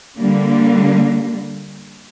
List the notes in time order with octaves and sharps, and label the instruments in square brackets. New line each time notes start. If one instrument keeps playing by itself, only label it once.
[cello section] D3 G3 A#3